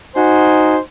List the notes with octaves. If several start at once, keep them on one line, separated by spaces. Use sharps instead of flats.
D#4 F#4 C5 G#5